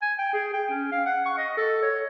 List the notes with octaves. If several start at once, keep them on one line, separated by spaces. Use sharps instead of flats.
G#5
G5
G#4
G5
C#4
F5
F#5
C#6
D#5
A4
C#5